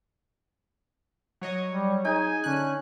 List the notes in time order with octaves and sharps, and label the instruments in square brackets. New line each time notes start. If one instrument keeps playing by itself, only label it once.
[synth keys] F#3 C#5 D#5
[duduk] G3
[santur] D#4 [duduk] G#4 [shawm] G#5
[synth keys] D3 F#6 [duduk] C#4